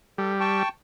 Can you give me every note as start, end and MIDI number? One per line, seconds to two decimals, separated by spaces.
0.18 0.63 55
0.18 0.33 69
0.40 0.69 79
0.40 0.69 81
0.40 0.69 85